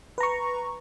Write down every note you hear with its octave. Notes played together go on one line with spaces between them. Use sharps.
B4 A#5 C#6